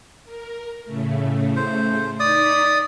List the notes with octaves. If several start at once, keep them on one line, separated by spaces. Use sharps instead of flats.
A#4
A2 C#3 A3
C5
D#4 D5 D#6 B6